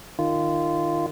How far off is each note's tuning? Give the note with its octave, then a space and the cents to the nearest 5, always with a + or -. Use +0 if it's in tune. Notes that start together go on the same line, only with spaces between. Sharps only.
D#3 -25 F4 -20